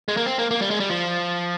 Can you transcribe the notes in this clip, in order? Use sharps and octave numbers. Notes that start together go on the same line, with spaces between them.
G#3
A#3
C4
A#3
A#3
G3
G#3
G3
F3